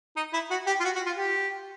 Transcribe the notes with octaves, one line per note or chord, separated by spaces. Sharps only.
D#4
E4
F#4
G4
F4
F#4
F#4
F4
G4